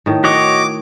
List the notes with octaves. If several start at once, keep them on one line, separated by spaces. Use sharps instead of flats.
A2 D#3
F#4 C#5 D#5 D6